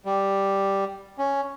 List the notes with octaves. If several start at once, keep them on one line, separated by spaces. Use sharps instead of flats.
G3
C#4